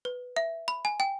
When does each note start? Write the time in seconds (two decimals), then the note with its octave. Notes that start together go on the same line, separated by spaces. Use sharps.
0.05 B4
0.36 E5
0.68 B5
0.85 G#5
1.00 G5